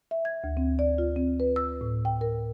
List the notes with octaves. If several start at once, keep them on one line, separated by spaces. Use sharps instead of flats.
E5
G#6
D2
C4
D5
F4
C4
B4
E6
A2
G5
A#4